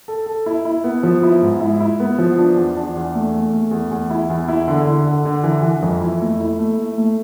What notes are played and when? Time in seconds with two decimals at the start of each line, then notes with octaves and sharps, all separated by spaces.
0.08 A4
0.26 A4
0.46 E4
0.65 E4
0.84 B3
1.03 F3
1.23 E4
1.42 G#2
1.61 E4
1.80 E4
2.00 B3
2.18 F3
2.38 D4
2.57 E2
2.77 D4
2.95 E2
3.15 A3
3.34 A3
3.53 A3
3.71 E2
3.91 E2
4.10 E4
4.30 E2
4.48 E4
4.68 D3
4.87 D3
5.06 D3
5.25 D3
5.44 E3
5.63 E3
5.82 F2
6.01 E4
6.21 A3
6.40 E4
6.59 A3
6.78 A3
6.98 A3